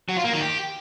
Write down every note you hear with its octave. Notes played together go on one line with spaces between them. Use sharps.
F#3
F4
A#3
D#3
G4